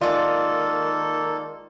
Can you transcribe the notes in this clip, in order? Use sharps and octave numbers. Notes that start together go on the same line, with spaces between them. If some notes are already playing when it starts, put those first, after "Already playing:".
D#3 G#3 A#3 F4 A4 D5